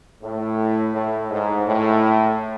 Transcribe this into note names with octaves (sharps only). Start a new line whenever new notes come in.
A2
A2
G#2
A2